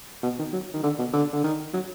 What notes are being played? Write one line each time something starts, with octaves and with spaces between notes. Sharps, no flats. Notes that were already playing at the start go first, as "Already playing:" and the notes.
B2
D#3
F#3
D#3
D3
B2
D3
D3
D#3
F#3